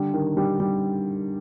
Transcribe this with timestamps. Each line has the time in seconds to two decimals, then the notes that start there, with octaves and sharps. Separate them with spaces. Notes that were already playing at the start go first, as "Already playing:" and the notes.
Already playing: D3 G3
0.14 D#3
0.37 G3
0.60 G3